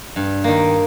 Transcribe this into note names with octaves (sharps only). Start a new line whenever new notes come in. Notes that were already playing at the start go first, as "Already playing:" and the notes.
G2
D#3 A#3